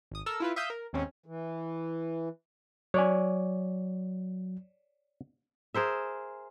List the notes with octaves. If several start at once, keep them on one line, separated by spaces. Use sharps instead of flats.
G#1 D#6
A4 A#4 E6
E4 F4 B4
E5 F5 D#6 G6
A#4
D#2 G#2 C4 C#4
E3
F#3 C#5 D5 G#5
G#4 A#4 C5 E5